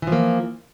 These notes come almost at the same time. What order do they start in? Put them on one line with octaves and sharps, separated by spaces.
E3 F3 A#3